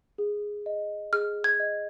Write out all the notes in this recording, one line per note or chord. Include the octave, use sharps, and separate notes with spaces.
G#4
D#5
G#4 F6
G#6
D#5